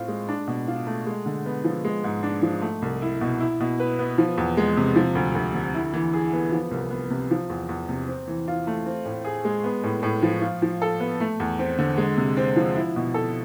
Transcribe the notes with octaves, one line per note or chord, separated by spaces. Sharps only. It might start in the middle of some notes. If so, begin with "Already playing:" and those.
Already playing: A2 C4 F4
G#3
D4
B2
F4
A3
G#3
D3
B3
F3
G#3
G#2
D4
F3
A3
C2
E4
B2
E4
B2
B4
B3
F3
E2
G#3
C3
F3
D2
D2
D3
E4
E3
G#4
B3
F3
C2
B3
C3
F3
E2
E2
C3
C4
E3
F4
A3
C4
A2
G#4
G#3
B3
A2
A2
F3
F4
F3
A4
B3
A3
E2
C4
D3
G#3
C3
C4
F3
E4
B2
A4